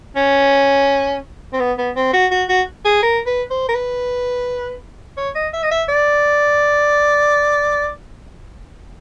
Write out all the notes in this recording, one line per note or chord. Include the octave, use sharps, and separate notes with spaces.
C#4
C4
B3
B3
C4
F#4
F#4
F#4
G#4
A#4
B4
C5
A#4
B4
C#5
D#5
E5
D#5
E5
D5